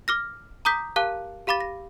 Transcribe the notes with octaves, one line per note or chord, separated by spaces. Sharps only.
D6 F6 A#6
A#5 D6 D#6 G6 B6
G4 A#4 F5 A5 D6 F#6
G4 F5 B5 D6 A6
A#6